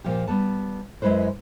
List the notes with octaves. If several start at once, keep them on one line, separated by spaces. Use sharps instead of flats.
A#2 F3 G4
G3 B3 A5
F#2 G#3 E4 B4 C5